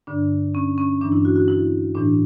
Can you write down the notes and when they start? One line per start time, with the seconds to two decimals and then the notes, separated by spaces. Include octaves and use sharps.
0.07 G2 D3 D4
0.55 C#4
0.78 C#4
1.01 G2 E3 D4
1.12 E4
1.25 F#4
1.36 F#4
1.48 E4
1.95 A2 E3 D4